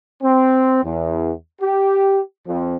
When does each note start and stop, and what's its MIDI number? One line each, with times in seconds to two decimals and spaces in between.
0.23 0.81 60
0.84 1.32 40
1.62 2.20 67
2.47 2.77 41